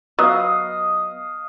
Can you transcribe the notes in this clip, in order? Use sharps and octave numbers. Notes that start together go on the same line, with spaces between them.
F#3 B3 D#5 F5